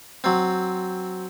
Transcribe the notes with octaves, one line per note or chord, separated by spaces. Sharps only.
F#3 C4